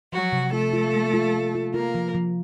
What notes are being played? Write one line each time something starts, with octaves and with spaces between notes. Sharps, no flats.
F3 F#3 F#4
C3
A3 F4 A4
F4
A#3
F4
C3
F4
A#3 F4 A#4
F3
F3